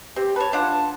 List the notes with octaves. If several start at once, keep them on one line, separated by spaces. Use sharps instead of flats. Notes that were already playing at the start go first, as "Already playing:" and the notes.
C4 G4
B4 C#5 A5
D4 F4 F#5